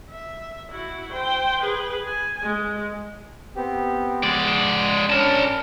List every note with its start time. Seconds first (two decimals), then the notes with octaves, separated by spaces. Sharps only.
0.10 E5
0.70 E4 F#4
1.12 C5 G5
1.61 G#4 B4
2.06 G#5
2.42 G#3
3.56 B3 C4 G4
4.23 G#3 D5 F#5 C6 D6
5.10 C#4 D4 A#4 A5